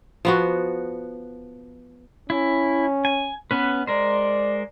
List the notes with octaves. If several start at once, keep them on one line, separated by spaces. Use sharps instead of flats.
F3 B3 F#4
C#4 E4
G#5
B3 C#4 B4
G#3 A#4 C5 D5